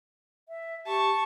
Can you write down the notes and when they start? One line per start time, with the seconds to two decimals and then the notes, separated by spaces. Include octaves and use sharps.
0.49 E5
0.86 G4 A5 C#6